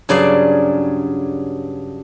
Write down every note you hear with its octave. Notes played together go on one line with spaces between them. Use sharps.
G2 C#3 F#3 G#4 D5 F5